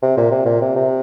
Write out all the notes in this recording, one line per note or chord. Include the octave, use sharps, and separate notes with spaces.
C3
A#2
C3
A#2
C3
C3